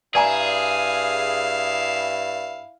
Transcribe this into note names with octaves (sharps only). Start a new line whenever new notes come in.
G2 E4 G#4 D5 F5 G#5 A#5